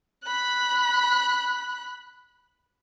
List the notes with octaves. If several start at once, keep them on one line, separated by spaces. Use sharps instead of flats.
B5 F#6